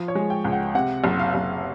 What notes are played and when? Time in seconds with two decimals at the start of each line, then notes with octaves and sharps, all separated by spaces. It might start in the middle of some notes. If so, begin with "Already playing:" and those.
Already playing: F3
0.08 C#5
0.15 G#3
0.30 G5
0.45 C#2
0.52 F#5
0.75 C3 F#5
1.04 F#1
1.19 F5
1.34 F#1